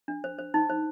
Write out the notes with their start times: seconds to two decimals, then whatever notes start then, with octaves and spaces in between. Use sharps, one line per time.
0.08 D4
0.24 C5
0.39 C5
0.54 D#4
0.70 C5